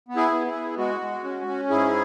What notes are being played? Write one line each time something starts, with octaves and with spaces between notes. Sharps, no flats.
B3
E4 G#4
B3
E4 G#4
B3
G#3 F#4
G#3
C#4
C#4
G#2 E4 G#4